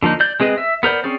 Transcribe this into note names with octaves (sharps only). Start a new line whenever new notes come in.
D3 F3 A#3 D#4
D5 G6
G#3 C4 G#4 B4 D#5
E5
B3 A#4 C5 D5
C4 C#4 G#4 D5